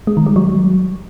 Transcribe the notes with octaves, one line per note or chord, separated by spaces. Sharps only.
G#3
D#3
G3
F#3